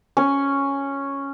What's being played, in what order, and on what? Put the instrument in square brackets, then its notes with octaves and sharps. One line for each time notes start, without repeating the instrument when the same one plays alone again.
[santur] C#4